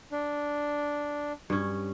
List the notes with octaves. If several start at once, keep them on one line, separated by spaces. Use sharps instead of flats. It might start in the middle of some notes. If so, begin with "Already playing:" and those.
D4
G2 C#4